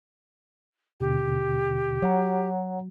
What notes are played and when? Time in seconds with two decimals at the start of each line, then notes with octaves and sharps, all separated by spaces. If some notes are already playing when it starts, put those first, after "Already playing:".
1.00 D#2 B2 D3 G4
2.02 F#3 C#5 F#5 A#5